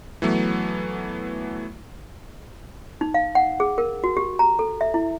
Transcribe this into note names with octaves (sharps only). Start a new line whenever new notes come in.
E3 F#3 A3 B3
D#4
F5
F#5
G#4
A#4
F#4
G4
A#5
A4
E5
E4